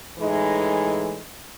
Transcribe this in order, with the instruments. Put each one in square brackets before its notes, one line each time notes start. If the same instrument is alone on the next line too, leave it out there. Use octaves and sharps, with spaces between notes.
[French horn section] A2 E3 G#3 D#4 E4